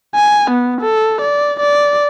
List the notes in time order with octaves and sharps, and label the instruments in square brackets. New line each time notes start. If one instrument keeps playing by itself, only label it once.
[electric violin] G#5
B3
A4
D5
D5